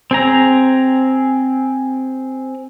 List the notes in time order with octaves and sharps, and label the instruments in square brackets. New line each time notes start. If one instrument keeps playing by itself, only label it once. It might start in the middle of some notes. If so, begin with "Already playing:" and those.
[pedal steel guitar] C4 G#4 A#5